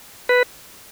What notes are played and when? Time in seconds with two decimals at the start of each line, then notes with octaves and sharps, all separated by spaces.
0.29 B4